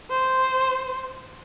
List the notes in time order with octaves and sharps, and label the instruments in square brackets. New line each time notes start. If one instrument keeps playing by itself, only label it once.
[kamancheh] C5